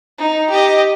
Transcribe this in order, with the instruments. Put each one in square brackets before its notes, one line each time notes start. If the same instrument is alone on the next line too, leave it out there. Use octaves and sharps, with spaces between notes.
[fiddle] D#4
G4 D#5